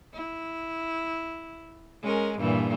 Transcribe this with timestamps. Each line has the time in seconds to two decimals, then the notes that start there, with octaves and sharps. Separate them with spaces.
0.13 E4
2.02 G#3 C#4 A#4
2.38 G2 A#2 E3